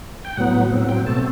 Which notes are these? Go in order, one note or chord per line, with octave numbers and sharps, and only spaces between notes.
G5
A2 F#3 B3 F#5
A2 F#3 C4
F#5
G5
B2 A3 C4 A5